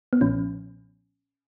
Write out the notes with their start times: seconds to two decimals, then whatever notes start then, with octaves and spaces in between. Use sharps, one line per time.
0.13 B3
0.21 B1 A#2 F3 C#4